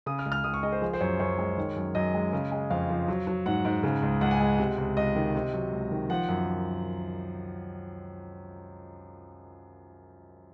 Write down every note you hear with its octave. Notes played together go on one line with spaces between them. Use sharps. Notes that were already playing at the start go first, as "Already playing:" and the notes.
C#3 D#6
F6
C#2
F6
C#2 D#6
C#6
G#3 D#5
C5
F3 G#4
C5
F#2 C#5
F#2 C#5
G#3
D#3
F#2
F#2 D#5
G#3
C#3
G#3
F2 F5
F3
F#3
F#3
G#2 F#5
G#2
C#3
C#2
C#2 F#5
G#5
G#3 F#5
C3
C#2
C#2 D#5
D#3
C3
F#3
C#2
D#3
F3 F#5
F#2